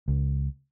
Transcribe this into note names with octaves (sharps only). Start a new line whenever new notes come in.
C#2